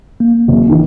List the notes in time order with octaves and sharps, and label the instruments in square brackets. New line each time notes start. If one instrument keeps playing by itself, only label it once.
[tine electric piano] A#3
[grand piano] F#1
D#3 E3